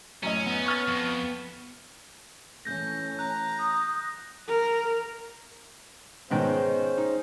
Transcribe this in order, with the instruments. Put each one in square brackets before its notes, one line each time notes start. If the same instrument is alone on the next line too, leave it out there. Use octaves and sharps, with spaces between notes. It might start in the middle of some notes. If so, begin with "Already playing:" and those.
[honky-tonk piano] F#2 A2 D#5 [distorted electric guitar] C#4
[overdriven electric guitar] B3
[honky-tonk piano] C#6 F6 A6
[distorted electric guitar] F2
[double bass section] E3 A3 C#4 [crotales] G6 A#6
[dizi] A#5 [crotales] F#6
[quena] D#6
[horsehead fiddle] A#4
[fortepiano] G#2 D#3 B3 [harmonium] G#3 C#4 C5
[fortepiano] D#4